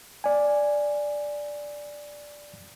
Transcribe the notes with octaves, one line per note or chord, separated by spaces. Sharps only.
D5 G#5